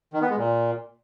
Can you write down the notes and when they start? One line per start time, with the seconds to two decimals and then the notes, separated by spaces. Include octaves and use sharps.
0.13 D#3
0.21 B3
0.30 G#3
0.38 A#2